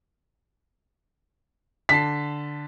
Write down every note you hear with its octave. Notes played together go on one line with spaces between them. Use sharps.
D3 A5 B6 C7